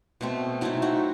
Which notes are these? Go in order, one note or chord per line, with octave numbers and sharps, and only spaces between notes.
B2 A3 C4
F#3 A3 C4 D#4 E4
D#4 F#4